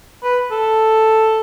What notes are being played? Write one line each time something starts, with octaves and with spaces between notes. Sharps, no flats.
B4
A4